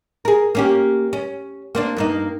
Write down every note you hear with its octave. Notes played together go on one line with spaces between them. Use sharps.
G#4 A#4
A#3 C#4 G4
C#4
A#3 C4 D4
G2 A#3 D#4